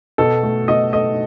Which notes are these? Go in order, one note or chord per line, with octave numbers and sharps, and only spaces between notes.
B2 A4
A3
B2 D#5
A3 D#5